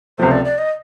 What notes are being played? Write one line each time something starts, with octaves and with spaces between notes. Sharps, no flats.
C#2 C3 F3 A3 C5
D5
D5
D#5